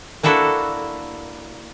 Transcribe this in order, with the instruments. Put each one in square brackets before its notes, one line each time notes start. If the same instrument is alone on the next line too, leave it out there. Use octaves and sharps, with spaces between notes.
[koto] A#3 D4 E4 F#4 A4